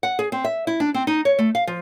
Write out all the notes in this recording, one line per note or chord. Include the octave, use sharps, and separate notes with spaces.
F#5
G#4
C4
E5
E4
D4
C4
D#4
C#5
A3
F5
F3